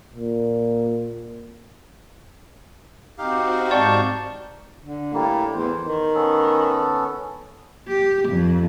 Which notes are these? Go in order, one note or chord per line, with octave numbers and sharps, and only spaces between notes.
A#2
C4 D#4 F#4 G4 F5
G#2 D5 A5 C#6 G6
D3
A2 G3 A#3
E2 C5
D#3
B3 C#4 A4
G4
F2